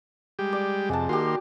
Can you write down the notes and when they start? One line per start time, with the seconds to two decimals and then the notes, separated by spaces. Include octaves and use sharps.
0.39 G3 G#3 G4
0.53 D5
0.89 F2 C3 G#3 F#5 A5
1.09 D#3 A#3 F#4 G4 C6